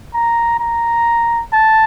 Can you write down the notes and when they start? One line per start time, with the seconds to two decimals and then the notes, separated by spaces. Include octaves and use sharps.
0.14 A#5
0.60 A#5
1.53 A5